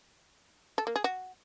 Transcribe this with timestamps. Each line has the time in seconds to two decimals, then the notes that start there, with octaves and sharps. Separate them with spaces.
0.78 A4
0.87 A#3
0.96 G#4
1.04 F#4